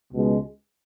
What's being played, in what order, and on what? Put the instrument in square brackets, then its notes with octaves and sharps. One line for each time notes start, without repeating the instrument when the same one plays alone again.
[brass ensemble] C#2 B2 G#3